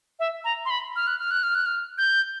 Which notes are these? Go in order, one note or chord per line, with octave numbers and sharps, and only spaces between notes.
E5
A#5
C6
B5
F6
F#6
F6
F#6
F6
F#6
F6
G6